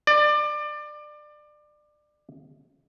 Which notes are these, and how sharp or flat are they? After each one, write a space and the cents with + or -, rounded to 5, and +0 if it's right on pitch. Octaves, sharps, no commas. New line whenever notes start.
D5 +25